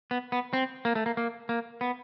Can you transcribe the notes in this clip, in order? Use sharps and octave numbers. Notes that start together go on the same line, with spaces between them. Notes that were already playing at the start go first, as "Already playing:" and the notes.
B3
B3
C4
A#3
A3
A#3
A#3
A#3
B3